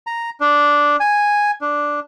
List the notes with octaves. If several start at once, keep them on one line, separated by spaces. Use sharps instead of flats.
A#5
D4
G#5
D4